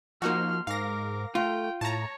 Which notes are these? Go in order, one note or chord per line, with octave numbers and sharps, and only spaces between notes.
F3 A#3 D#4 F#4 C6 F6
G#2 A#4 F5 D6 A#6
A3 F4 G5
A2 C#5 A5 A#5